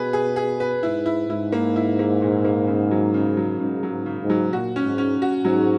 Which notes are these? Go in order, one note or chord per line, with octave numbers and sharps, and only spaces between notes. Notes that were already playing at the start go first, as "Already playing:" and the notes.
Already playing: B2 G#4 B4
G#4
G#4
B4
G#2 E4
E4
G#2 E4
A#3
E4
A#3
A#2
A#3
C#3
F#3
C#3
F#3
G#2 C#3
F#3
G#2
C#3
G#2
F#3
A#2 F#4
C#4
G#2
C#4
F#4
G#2 F#3